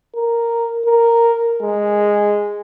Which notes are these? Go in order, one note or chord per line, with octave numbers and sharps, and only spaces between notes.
A#4
A#4
G#3